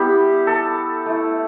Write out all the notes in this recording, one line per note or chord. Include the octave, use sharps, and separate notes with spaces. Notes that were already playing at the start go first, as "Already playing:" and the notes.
Already playing: G3 B3 E4 G4
A4
A3 E4